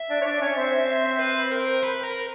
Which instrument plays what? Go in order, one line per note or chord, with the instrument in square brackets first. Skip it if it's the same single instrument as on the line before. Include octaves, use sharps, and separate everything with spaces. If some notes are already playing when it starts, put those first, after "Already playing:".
Already playing: [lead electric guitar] E5
[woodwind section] D4 D5
C#5
D4 D5
C#4 C#5
C4 C5
[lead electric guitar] B4
A#4
B4
A#4